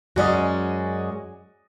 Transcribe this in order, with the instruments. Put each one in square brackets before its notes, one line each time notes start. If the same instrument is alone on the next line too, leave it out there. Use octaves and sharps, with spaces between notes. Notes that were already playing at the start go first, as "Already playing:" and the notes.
[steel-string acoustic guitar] F#2 G#3 C#4 [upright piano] F#4 D5 D#5